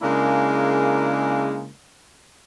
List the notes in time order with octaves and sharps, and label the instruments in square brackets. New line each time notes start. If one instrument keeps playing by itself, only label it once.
[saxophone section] C#3 G#3 A#3 D4 E4 A#4